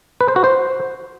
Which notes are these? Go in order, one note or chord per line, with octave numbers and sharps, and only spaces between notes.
B4
C5
F#4
C5